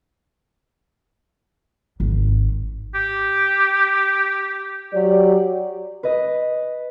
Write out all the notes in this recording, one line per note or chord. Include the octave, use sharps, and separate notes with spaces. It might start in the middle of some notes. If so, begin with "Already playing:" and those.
G#1
G4
F#3 G4 D5
B4 D#5